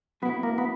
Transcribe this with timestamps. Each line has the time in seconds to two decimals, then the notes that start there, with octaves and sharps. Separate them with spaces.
0.22 B2 F#3 A3 B3 C4 E4
0.43 A#3
0.58 B3